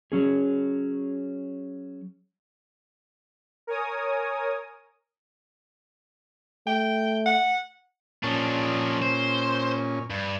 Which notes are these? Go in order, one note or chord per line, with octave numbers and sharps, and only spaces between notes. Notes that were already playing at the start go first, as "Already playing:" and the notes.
F#3 C#4 G#4
A#4 C#5 G#5 D#6
A3 G5
F#5
A#2 F3 C#4 D4
C5
G2